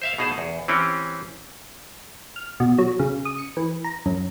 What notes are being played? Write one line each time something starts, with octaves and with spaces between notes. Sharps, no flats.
C5 E5 F5
B2 D#4 G#4 C5 A5
E2
E3 C4 C#4 G4
F6
B2
F#3
C#3
D#6
C#7
E3
A#5
F#2